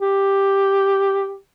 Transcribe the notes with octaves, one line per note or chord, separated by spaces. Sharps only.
G4